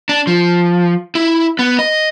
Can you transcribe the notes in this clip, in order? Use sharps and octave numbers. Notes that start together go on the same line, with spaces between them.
D4
F3
E4
B3
D#5